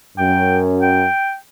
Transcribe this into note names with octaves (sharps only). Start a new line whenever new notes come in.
F#2 G5
G5